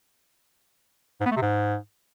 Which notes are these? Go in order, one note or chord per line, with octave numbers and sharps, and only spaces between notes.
G#2
B3
A3
C3
G#2